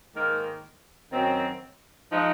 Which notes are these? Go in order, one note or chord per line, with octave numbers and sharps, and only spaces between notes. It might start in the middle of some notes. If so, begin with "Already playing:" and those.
G#2 D#3 A#3 D#4 A#4
F#2 D#3 F#3 C4
F3 G#3 D#4